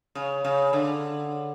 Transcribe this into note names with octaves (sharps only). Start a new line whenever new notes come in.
C#3
C#3
D3